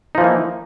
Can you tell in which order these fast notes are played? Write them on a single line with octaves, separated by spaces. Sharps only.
D#4 F3 E3 A#3